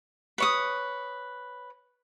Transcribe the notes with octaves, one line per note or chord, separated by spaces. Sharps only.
B4 C#5 D#6